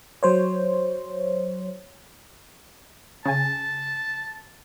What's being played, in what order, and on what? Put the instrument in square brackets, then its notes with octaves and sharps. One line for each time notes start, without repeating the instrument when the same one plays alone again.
[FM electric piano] F#3 C5 C#5
[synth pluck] C#3 G#5 [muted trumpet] A5